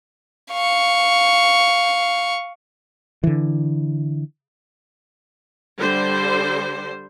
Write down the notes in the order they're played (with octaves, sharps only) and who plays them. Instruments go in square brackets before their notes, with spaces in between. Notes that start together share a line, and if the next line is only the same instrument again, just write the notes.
[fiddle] F5 C#6
[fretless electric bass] D3 E3
[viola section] D3 G3 C5